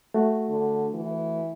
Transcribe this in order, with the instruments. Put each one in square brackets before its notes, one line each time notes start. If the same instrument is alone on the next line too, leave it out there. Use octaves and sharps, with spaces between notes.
[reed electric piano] A3 F#4
[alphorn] D3
E3